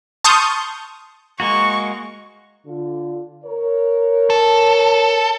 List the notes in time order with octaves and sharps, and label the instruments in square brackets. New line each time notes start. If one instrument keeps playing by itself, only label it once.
[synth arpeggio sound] A5 C6 C#6 D#6 F6 G6
[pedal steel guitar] G#3 A#3 F#4 [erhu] C#6
[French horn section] D3 F4
A#4 C#5
[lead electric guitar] A4